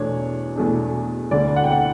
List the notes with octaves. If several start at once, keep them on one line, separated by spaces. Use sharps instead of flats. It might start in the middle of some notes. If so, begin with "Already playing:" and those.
Already playing: E2 B2 A3 D4 C#5
E2 B2 A3 D4
D2 D3 A3 D5
F#5
G5
F#5